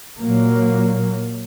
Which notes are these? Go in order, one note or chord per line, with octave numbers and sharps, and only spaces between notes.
A#2 F#3 A#3